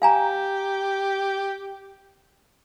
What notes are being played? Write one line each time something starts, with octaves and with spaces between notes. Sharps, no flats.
G4 F5 G#5 A#5